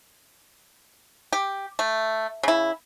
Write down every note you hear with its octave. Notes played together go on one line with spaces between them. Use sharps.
G4
A3
C#3 E4